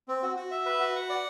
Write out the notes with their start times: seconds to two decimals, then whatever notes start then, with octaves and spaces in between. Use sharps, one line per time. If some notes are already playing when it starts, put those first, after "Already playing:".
0.08 C4
0.23 F#4
0.36 F#4
0.51 E5
0.66 B4
0.80 F#4
0.96 F#5
1.10 D5